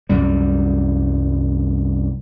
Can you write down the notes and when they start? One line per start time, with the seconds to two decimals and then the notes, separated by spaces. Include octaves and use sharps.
0.09 C2 F#2 G3